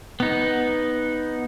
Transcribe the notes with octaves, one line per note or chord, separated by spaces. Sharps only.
B3 D#4